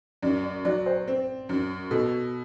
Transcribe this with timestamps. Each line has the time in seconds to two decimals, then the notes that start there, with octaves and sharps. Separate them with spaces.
0.22 F#2 D5
0.43 D5
0.65 F#3 D5
0.86 C5
1.08 C4
1.49 F#2
1.91 B2 A4